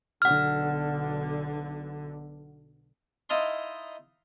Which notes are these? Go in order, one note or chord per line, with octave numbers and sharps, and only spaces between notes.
B1 D3 F#5 F6
D#4 E4 D#5 F5 A5 C6